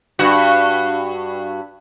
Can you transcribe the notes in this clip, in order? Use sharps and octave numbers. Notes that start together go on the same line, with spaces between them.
G2 F#4